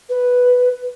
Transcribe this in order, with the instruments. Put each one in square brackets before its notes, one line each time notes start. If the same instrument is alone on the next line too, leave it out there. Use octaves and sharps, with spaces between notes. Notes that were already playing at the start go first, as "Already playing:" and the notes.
[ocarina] B4